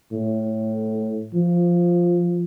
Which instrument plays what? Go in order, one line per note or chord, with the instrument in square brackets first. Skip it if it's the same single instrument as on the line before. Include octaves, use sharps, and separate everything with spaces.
[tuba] A2
F3